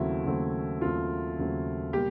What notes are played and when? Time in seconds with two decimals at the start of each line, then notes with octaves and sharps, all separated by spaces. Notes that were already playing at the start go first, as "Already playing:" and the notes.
Already playing: D#2 C#3 F#3 A3 C4 E4
0.26 D#2 C#3 F#3 A3 C4
0.81 D#2 C#3 F#3 A3 C4 F4
1.38 D#2 C#3 F#3 A3 C4
1.93 B2 G3 A#3 G4